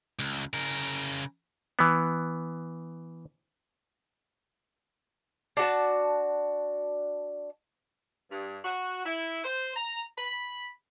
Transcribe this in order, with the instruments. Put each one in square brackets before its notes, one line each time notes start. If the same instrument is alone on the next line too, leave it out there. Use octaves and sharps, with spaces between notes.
[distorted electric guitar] C#2
C#3 A#4
[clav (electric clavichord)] E3 B3
[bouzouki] D4 F#4 A5
[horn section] G2
F#4
E4
C5
A#5
B5